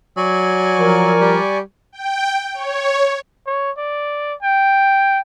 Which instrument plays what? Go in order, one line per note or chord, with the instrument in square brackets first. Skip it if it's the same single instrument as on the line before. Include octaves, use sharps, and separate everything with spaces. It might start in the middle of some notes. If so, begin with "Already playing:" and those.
[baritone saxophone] F#3 [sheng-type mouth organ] D5 G#5 C#6
[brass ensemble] F3 A#4
[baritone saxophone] G3
[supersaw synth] G5
C#5
[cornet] C#5
D5
G5